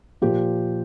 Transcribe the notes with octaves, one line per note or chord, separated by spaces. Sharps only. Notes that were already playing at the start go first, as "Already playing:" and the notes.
A#2 F3 G4